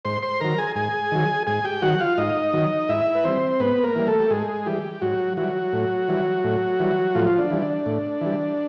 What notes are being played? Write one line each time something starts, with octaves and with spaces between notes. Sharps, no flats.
G#2 C5 C6
C5 C6
D#3 F#3 A#4 A#5
G#4 G#5
G#2 G#4 G#5
D#3 F#3
G#2 G#4 G#5
G4 G5
D#3 F#3 F#4 F#5
F4 F5
G#2 D#4 D#5
D#3 F#3
G#2 E4 E5
B4
E3 G3 C4 C5
G#2 B3 B4
A#3 A#4
E3 G3
A3 A4
G4
G#2 G#3 G#4
E3 G3 G4
G#2 F#3 F#4
E3 F#3 G3 F#4
A2
E3 G3
A2
E3 G3
A2 F3 F4
D4
E3 G3
D4
A2
E3 G3